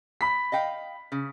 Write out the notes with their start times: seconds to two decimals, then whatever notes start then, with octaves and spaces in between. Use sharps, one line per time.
0.21 B5 B6
0.52 D#5 F5 G5
1.12 C#3